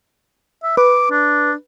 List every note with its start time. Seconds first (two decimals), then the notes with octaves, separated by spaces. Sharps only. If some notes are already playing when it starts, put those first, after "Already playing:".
0.63 E5
0.77 B4 D6
1.11 D4